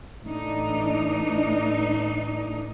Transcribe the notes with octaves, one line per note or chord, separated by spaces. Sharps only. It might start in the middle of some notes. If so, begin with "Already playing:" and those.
A2 E3 A3 D4 D#4